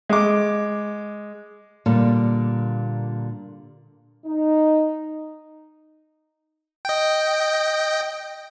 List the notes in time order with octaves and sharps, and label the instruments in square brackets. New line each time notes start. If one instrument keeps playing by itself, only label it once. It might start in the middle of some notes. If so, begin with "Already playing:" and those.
[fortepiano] G#3 D6
[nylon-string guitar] A#2 D3 G3
[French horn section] D#4
[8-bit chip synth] D#5 G5